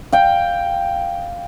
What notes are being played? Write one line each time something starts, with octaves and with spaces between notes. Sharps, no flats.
F5 G5